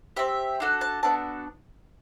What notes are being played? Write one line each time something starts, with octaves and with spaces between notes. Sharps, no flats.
C4 G4 E5
D4 F#4 A4
A5
B3 D4 F#4 A4 A5